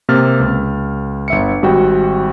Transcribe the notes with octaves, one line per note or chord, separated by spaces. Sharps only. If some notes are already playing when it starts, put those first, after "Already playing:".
C3 A#3 F6 A6
C#2
G1 E5 C#7
G#1 G3 F#4 G5